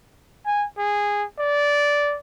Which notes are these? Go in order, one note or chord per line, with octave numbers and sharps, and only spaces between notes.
G#5
G#4
D5